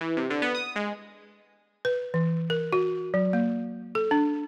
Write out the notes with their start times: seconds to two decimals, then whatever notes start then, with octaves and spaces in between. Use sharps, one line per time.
0.01 E3
0.17 C3
0.30 D3
0.42 B3
0.55 D#6
0.76 G#3
1.85 B4
2.14 E3
2.50 A#4
2.73 F#4
3.14 F#3
3.33 A#3
3.95 A4
4.11 D4